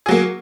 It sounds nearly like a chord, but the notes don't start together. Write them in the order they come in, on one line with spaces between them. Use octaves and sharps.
G#4 F#3 A#3